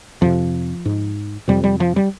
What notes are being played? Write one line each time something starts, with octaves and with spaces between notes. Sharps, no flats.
F2 C3 F3
G#2
F2 C3 G3
G3
F3
G3